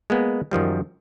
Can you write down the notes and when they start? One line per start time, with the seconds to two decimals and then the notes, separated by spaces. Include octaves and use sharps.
0.10 G#3 A#3 B3
0.51 F#2 D#3 F3 G3